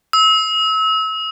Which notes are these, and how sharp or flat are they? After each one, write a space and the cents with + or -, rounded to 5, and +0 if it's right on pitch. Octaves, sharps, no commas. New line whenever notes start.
E6 -30